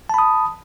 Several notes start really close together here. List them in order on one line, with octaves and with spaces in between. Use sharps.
A5 B5 D#6